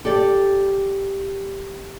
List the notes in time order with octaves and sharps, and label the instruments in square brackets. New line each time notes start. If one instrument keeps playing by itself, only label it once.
[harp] G4 A6 [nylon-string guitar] A4 D5